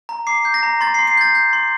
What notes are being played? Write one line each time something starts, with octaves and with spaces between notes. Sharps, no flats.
A#5
D6 C7
G6
A#6
A#5
C6 A6
C7
C6
C7
G6 A6
G6
C6